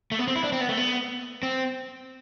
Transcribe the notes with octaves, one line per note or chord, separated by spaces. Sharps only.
A3
B3
C4
E4
D4
C4
B3
A3
B3
C4